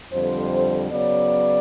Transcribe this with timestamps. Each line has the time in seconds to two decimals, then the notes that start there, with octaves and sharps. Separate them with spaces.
0.13 F2 D3 G3 C5
0.91 C#3 F#3 B3 D5